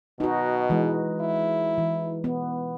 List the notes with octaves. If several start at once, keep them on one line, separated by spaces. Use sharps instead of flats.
B2 D#4 F#4
E3 G#3
E4
E3
B3